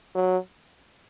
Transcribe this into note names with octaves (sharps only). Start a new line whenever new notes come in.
F#3